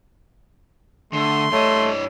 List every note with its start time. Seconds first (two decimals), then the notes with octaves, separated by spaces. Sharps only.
1.13 D3 A3 C6
1.52 G2 A3 C#5 D#5